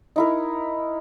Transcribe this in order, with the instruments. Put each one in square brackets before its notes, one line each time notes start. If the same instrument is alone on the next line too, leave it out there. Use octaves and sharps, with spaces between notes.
[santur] D#4 E4 A#4